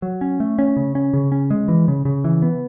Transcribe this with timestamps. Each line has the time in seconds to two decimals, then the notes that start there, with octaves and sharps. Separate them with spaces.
0.02 F#3
0.21 C#4
0.40 A3
0.59 C#4
0.76 C#3
0.95 C#4
1.13 C#3
1.32 C#4
1.50 G#3
1.68 E3
1.88 C#3
2.05 C#3
2.24 E3
2.42 B3